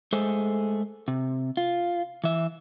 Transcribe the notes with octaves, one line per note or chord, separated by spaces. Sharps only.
G#3 A3 G#4 A4 C5
C3
F4
E3 E5